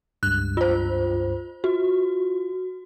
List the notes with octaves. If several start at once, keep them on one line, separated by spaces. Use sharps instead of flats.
C#2 G2 F#6
F4 C5
F4 F#4